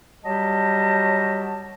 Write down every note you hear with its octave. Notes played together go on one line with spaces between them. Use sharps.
F#3 G3 G4 D#5 A5